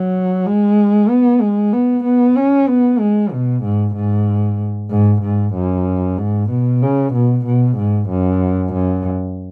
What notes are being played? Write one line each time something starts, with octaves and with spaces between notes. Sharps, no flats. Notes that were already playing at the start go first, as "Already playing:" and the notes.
Already playing: F#3
G#3
B3
G#3
B3
B3
C#4
B3
G#3
B2
G#2
G#2
G#2
G#2
F#2
G#2
B2
C#3
B2
B2
G#2
F#2
F#2